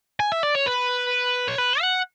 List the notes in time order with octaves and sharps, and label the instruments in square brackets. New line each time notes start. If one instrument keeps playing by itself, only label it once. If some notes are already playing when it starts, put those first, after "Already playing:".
[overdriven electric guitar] G#5
E5
D5
C#5
B4
C#5
B4
F#5